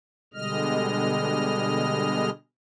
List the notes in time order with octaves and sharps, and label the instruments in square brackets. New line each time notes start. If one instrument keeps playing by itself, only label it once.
[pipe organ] B2 D3 G3 G#3 D#5 F6